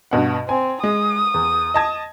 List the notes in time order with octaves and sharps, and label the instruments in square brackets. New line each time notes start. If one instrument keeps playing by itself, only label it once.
[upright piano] G2 B2 F#5
[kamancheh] C4 [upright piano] G#5
[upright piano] G#3 [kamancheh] D#6
[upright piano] E2
D#5 A5 G#6